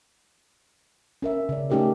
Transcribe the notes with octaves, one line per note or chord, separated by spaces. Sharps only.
C#4 A#4 E5
C#3 D5
A3 C#4 D#4 G4 A4 A#4